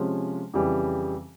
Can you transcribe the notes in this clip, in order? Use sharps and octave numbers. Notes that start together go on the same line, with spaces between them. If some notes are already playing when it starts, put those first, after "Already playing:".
Already playing: C3 F3 G#3 C#4
F2 C#3 E3 G3